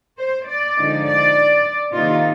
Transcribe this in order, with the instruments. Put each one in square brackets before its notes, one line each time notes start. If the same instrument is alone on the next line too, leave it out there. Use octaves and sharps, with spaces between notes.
[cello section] C5
D5
D3 F3 G#3 D#4
D5
C3 D#3 A#3 D#4 F4